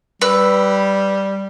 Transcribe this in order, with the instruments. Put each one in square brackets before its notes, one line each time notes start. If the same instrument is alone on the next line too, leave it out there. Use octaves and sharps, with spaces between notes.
[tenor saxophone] G3 [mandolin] B4 E6